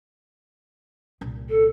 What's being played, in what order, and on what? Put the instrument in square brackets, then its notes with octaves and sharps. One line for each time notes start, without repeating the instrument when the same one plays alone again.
[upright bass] C2 A#2
[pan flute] A4